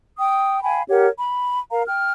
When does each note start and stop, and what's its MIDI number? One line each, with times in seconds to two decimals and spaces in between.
0.18 0.60 79
0.18 0.60 87
0.63 0.81 77
0.63 0.81 79
0.63 0.81 80
0.63 0.81 83
0.89 1.08 67
0.89 1.08 70
0.89 1.08 73
0.89 1.08 78
1.18 1.60 83
1.70 1.83 70
1.70 1.83 77
1.70 1.83 82
1.88 2.12 79
1.88 2.12 89